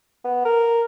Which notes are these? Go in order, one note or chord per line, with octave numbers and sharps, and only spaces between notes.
B3
A#4